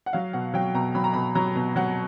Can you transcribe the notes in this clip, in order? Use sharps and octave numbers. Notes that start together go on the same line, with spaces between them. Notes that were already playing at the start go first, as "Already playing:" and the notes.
F#5
F#3 F5
B2 F#5
F#3 G5
B2 A#5
F#3 B5
A#5
B2 B5
F#3 A#5
B2
F#3 F#5